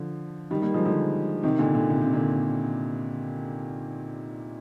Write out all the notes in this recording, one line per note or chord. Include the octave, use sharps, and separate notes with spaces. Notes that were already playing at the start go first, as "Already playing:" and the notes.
Already playing: D3 F3
D#3 G3
G3 A#3
F3 G#3
D3 F3
C3 D#3
A#2 D3
A#2 D3
C3
C3
A#2 D3